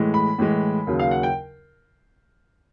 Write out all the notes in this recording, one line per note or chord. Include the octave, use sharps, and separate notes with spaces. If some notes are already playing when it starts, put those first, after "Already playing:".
Already playing: A2 E3 G#3
B5
A2 E3 G#3
D#2 C#3 F#3
F5
F#5
G5